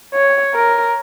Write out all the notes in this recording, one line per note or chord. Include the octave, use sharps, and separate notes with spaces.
C#5
A#4